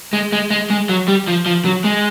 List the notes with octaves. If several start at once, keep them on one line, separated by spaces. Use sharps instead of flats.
G#3
G#3
G#3
G#3
F#3
G3
F3
F3
F#3
G#3